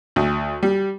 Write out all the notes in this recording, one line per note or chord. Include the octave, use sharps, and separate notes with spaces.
D2
G3